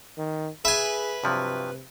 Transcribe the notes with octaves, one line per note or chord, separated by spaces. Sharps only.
D#3
G#4 B4 E5 G#5
G2 C3 F3 F#3